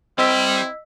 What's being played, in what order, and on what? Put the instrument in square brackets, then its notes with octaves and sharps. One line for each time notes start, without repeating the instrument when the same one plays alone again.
[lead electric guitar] G3 [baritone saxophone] C4 [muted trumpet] E4 [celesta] D#5 E6 B6